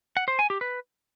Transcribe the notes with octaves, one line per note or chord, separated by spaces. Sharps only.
F#5
C5
G#5
G4
B4